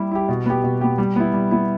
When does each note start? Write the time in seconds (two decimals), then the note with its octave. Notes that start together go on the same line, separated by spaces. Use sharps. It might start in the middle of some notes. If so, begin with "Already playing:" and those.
Already playing: G3 E4 G4
0.12 E4 G4
0.29 B2
0.46 B3 G4
0.64 B2
0.81 B3 G4
0.98 G3
1.16 B3 E4
1.33 G3
1.51 B3 E4